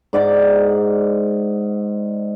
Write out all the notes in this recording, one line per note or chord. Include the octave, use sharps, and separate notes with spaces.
G#2 D5 F#5 D6